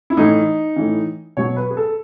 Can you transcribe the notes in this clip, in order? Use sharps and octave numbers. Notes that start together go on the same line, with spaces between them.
E4
A2 E3 D#4
A2 E3
B2 F#3 C#5
B4
G#4
A4